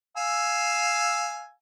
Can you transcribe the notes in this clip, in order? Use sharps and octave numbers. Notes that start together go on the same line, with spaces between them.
F5 G#5 E6